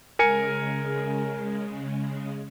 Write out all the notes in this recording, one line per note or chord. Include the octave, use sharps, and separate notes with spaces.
C#3 G#3 A#4 G#5 C#7